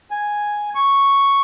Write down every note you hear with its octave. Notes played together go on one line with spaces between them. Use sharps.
G#5
C#6